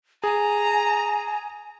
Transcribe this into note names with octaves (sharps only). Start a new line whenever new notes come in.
G#4 G#5 A#5